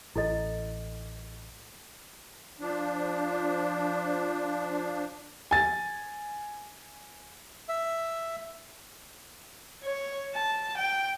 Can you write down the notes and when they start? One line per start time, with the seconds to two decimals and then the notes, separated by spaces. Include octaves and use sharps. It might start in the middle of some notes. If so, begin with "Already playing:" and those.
0.16 A1 E4 A4 D#5
2.60 F3 D4
5.51 G#5 A6
7.69 E5
9.84 C#5
10.35 A5
10.78 G5